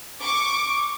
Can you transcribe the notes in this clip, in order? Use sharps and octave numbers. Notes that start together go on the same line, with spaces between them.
C#6 D6